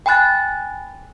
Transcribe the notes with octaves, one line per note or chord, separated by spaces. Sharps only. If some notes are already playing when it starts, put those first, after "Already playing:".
G5 G#5 B5 F#6 A6